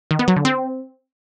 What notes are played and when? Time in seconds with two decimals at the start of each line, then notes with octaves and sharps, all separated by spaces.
0.11 D#3
0.19 B3
0.28 F#3
0.36 D3
0.45 C4